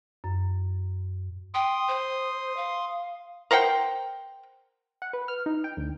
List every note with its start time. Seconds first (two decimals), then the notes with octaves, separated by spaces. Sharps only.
0.24 F#2
1.54 G5 C6 D#6
1.88 C5
2.56 F5
3.51 A#4 C5 F#5 G5
5.02 F#5
5.13 B4
5.28 F6
5.46 D#4
5.64 G5
5.77 D2